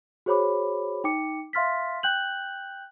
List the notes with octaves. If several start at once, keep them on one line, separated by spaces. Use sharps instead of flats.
F#4 G#4 C5 C#5 B5 D6
D#4 G5 D6 C#7
E5 F5 C6 F6 A6 B6
G5 F#6 G6 F#7